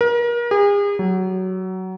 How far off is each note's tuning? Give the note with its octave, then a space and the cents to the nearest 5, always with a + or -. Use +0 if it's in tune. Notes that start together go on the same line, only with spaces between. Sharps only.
A#4 +35
G#4 -40
F#3 +15